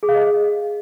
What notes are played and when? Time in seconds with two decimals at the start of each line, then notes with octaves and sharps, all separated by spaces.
0.03 G#4
0.09 F5
0.15 D#5